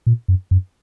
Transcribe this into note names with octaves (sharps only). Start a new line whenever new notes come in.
A#2
F#2
F#2